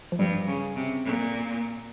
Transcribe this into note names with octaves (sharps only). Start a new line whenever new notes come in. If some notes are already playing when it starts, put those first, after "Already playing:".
F3
G2 G3
C#3
C3
A#2